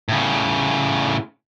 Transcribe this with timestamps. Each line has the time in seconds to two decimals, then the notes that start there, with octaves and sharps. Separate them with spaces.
0.09 A2 C#3